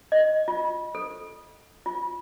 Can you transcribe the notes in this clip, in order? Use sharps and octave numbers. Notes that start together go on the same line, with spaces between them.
D#5
F4
A4
F4